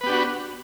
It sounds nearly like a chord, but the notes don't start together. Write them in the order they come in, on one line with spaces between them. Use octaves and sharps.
B4 B3 G4 D4 F#4